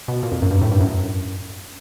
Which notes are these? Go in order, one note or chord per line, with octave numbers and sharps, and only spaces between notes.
B2
A#2
F2
F#2
G2
A2
G2
F#2